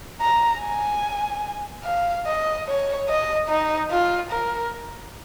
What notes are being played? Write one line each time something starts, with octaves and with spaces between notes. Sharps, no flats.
A#5
G#5
F5
D#5
C#5
D#5
D#4
F4
A#4